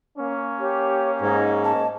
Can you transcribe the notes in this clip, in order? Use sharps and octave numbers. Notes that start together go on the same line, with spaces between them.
A#3 C#4
G4 C#5
G#2 D#4 G#6
D#5 A5